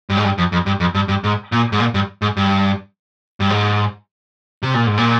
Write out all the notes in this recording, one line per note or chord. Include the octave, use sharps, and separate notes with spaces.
G2
G#2
G2
F2
F2
G2
F2
G2
G2
G#2
A#2
G#2
A#2
G2
G#2
G2
G2
G#2
C3
A#2
G#2
A#2